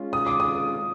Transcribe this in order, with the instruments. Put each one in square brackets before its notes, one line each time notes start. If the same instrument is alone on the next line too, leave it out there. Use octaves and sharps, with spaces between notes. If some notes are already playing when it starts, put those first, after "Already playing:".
Already playing: [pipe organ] G#3 C#4 F4
[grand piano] D#6
D6
D#6